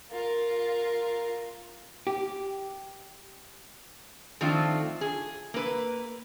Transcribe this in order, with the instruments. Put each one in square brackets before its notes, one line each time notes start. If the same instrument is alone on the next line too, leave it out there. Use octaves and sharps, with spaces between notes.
[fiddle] F4 A#4
[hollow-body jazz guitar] G4
[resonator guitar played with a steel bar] D#3 F3 A3 C4 D4 F4
G#4
A#3 B4